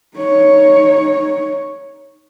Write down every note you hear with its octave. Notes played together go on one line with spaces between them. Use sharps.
D#4 C#5